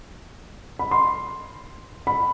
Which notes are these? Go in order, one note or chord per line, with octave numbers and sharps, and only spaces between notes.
B5
C6
B5